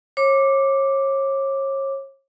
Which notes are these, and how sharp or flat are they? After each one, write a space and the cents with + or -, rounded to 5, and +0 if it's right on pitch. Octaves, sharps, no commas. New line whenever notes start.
C#5 -35 D6 +0